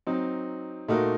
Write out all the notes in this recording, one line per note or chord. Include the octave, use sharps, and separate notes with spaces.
F#3 C4 D#4
A#2 A3 D#4 F#4 A#4